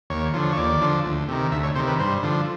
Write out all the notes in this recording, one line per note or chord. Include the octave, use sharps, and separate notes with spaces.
D#2 C#5
D3 F3
C#5
D#2 D5
D3 F3
D2
C3 D#3
D2 E5
C#5
C3 D#3 C5
B4
G2 C5
D3 F3